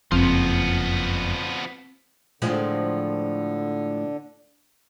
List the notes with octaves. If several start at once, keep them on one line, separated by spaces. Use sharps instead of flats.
F#1 F2 F3 B3 C4
A2 D3 F3 G#3